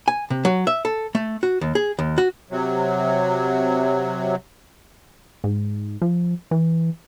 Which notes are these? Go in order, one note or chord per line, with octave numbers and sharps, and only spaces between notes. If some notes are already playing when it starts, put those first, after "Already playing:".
G#5
C3
F#3
E5
A4
A3
F#4
D#2
G#4
D#2
F#4
C3 F#3
G#2
F3
E3